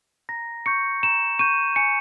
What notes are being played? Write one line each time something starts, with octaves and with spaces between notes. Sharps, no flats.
A#5 A#6
C#6 G6 C#7
A#5 E7
C#6 G6 D#7
G#5 C#7